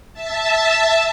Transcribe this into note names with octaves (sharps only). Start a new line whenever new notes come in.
E5 A5